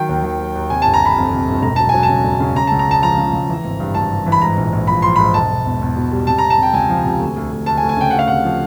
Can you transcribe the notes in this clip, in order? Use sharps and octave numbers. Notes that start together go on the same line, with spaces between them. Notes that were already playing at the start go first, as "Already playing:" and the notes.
Already playing: D#3 F#3 G5
D#2
D#3
F#3
D#2
C3 G#5
G1 A5
A#5
G1 B5
F2
C3
G1
E1 A#5
F#3 A5
F#3 G#5
A5
C#3
E1
C#3
C#3 A#5
C#2 A5
A#5
C#2 A5
F3 A#5
C#3
C#2
E3
G#1
G2
G#1 A5
G2
E3
B5
G#2 A#5
A#1
A#1
F3 B5
F3 C6
G#2 B5
E1 A5
E1
E2
E2
B2
G3
C3 A5
C3 A#5
A5
C3 G5
C#2 G#5
F3
C3
D2
D2
D2
D2 A5
G#5
D2
G#5
C#3 G5
D2 F#5
F5
C3 F#5
F3